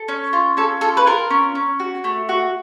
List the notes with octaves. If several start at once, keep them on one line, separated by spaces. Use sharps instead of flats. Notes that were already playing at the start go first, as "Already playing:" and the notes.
Already playing: A4
C#4
F4
C#4 A4
F4 A4
B4
F4 A#4
C#4
C#4
F#4
A3
F#4